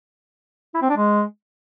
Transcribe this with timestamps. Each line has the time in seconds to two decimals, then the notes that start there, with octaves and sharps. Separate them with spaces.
0.75 E4
0.82 C4
0.90 D4
0.97 G#3